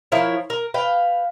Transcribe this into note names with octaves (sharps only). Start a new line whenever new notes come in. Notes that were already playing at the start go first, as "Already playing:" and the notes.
F3 E4 A#4 C#5
A#4
B4 F5 G5